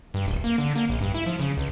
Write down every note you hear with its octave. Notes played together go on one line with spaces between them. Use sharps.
G2
D1
A#3
D3
A#3
A#1
G2
E4
F3
C#3
C#2